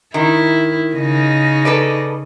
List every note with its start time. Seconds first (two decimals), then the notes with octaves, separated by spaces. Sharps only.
0.14 D#3 E4
0.96 C#3 D#4 D#5
1.65 A4 B4 D5